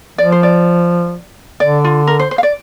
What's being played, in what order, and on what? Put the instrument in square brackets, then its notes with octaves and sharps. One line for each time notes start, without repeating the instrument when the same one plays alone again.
[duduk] F3 [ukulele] D5
[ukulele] C5
D5
[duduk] D3 [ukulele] D5
[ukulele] F4
A#4
C5
C5
F5
D5